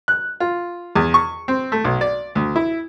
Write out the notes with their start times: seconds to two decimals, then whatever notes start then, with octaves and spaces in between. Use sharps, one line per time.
0.08 F#6
0.40 F4
0.95 E2
1.14 C#6
1.48 C4
1.72 A3
1.84 B1
2.01 D5
2.35 D2
2.56 E4